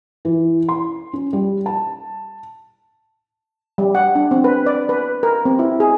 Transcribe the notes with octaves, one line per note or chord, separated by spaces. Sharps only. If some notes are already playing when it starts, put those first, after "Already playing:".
E3
C6
C#4
G3
A5
G3
F#5
D4
C4
B4
D5
B4
A#4
C4
E4
G#4